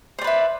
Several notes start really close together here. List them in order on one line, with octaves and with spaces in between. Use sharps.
C5 D5 B4 E5